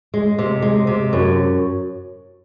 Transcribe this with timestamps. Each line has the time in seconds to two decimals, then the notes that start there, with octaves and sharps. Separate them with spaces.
0.14 G#3
0.39 C3
0.62 G#3
0.87 C3
1.13 F#2